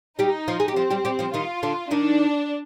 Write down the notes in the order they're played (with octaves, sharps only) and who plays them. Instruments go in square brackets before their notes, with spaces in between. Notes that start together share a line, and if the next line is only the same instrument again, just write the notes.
[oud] G3 G4 [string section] D#4
[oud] F3 F4
G#4
G4
[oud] F3 F4 [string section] C4
[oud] G3 G4
G3 G4
F3 F4
[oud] D#3 D#4 [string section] F4
[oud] D3 D4
[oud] D#3 D#4 [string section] D4